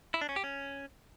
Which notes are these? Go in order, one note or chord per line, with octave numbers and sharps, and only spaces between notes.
E4
D4
C#4
G4
C#4